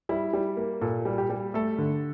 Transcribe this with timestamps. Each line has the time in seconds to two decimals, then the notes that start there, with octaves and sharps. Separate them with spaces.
0.09 G3 E4
0.33 G3
0.57 A#3
0.81 A#2 A4
1.05 G3
1.18 G4
1.30 G3
1.54 A3 A4
1.78 D3